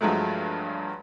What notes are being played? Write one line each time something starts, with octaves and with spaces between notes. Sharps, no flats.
G2 F3 F#3 G#3 A3